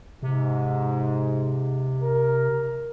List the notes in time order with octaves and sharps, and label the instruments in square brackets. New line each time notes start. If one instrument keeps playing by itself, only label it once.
[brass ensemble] G#2 [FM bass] C3
[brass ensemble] A#4